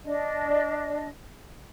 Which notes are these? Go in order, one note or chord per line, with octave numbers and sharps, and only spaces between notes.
D4 D#5